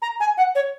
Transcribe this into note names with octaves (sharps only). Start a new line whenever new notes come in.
A#5
G#5
F#5
C#5